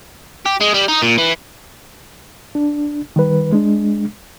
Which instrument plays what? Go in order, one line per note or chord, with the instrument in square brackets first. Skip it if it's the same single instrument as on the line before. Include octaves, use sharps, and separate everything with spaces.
[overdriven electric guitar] G4
G#3
G3
D#4
A#2
E3
[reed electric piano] D4
D#3 G3 B4
G#3 D4